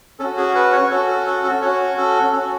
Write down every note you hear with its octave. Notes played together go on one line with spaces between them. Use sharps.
C#4 F#4 A4
G#4
B4
C#5
C#4 F#4 A4
A4
A4
A4
C#4 F#4 C#5
A4
C#4 F#4 A4